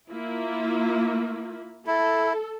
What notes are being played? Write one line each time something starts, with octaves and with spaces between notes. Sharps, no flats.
A#3 E4 F4
E4 A4